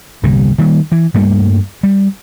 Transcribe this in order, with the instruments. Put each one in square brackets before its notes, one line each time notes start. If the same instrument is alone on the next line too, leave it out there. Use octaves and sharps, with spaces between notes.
[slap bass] G1 C2 A#2 G3
D#3 G3 A#3
E3
G2 G3 A3 A#3
G3